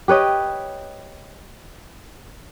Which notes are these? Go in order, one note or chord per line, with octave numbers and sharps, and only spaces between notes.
G4 B4 C#5 D#5